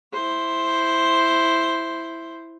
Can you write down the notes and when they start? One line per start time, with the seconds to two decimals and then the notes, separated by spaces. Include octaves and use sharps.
0.13 E4 C5